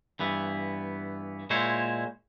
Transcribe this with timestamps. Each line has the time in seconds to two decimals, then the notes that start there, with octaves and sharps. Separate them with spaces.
0.19 G2 E3 B3
1.50 A#2 G#3 E4 C5 C#5